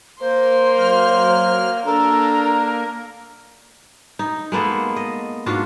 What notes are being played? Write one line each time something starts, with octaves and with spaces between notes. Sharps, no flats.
A#3 C5 C6
F#3 F6
A#3 D4 A4 A#4 A#5
D#4
G#3 A#3 B3 A4
D#5
G#2 D4 F4 F#4